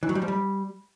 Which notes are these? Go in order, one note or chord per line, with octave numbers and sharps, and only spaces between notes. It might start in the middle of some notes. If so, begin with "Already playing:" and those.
E3
F#3
G3
F3
G3